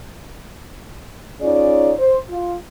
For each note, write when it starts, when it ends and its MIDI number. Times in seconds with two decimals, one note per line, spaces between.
1.41 1.92 61
1.41 1.92 63
1.41 1.92 65
1.41 1.92 68
1.41 1.92 73
1.41 1.92 74
1.99 2.18 72
2.30 2.53 65